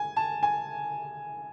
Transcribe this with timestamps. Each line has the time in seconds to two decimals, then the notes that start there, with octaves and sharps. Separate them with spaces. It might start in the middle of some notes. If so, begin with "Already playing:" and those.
Already playing: G#5
0.16 A5
0.43 G#5